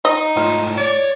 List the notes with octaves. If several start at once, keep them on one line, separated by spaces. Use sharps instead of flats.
D#4 D#5
G#2 A3 F4
C#5 D5